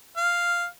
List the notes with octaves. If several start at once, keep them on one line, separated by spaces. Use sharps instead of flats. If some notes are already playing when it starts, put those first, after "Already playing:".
F5